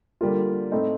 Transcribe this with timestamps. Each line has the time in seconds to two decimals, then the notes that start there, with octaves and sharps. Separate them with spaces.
0.21 D3 G3 A#3 F4
0.72 A2 A3 C4 D#4